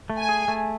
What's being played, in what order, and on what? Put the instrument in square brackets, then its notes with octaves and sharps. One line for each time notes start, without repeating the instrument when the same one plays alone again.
[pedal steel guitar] A3
[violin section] G#5
[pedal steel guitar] G#4
A3